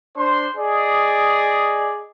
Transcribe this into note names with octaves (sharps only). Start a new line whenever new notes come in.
D4 C5 C6
G#4 D5 D#5